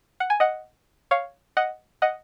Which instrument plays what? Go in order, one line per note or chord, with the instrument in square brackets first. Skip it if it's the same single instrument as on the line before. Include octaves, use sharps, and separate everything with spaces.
[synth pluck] F#5
G#5
D#5 F#5
C#5 F5
D#5 F#5
D#5 F#5